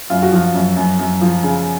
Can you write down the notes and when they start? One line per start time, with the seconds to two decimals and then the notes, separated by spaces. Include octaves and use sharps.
0.10 F#2 F4
0.22 F#4
0.32 F3 F4
0.54 F#2
0.77 F#2
0.99 F#2
1.21 F3
1.43 C#3